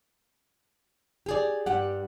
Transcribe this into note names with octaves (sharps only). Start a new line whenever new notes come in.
G4 G#4 D5
G2 G4 F#5